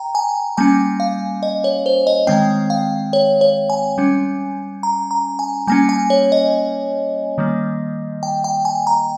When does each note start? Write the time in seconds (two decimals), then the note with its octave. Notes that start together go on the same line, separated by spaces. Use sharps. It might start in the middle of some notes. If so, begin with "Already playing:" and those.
Already playing: G5 A#5
0.15 G#5
0.57 G3 A#3 C#4 G#5
1.00 F5
1.43 D#5
1.64 C#5
1.86 C5
2.07 D#5
2.27 D#3 G#3 C4 G5
2.70 F5
3.13 C#5
3.41 C#5
3.70 G#5
3.98 G3 C#4
4.83 A#5
5.11 A#5
5.39 G#5
5.67 G3 A#3 C#4 G#5
5.89 G#5
6.10 C#5
6.32 D#5
7.38 D#3 G3 A#3
8.23 G5
8.44 G5
8.65 G#5
8.87 A#5